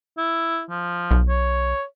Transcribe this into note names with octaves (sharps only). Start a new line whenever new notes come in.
E4
F3
B1
C#5